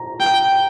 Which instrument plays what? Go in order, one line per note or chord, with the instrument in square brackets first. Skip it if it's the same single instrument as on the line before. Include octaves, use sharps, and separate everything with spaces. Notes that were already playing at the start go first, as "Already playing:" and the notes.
Already playing: [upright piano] A#5
[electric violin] G5